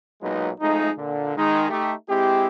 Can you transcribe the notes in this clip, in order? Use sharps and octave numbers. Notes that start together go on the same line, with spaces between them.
B1 A#2 F#3 G#3 D#4 B4
F2 G#3 A3 D#4
A#2 D3
D#3 G#3 D#4
A3 D#4 G4
G#3 C4 E4 G4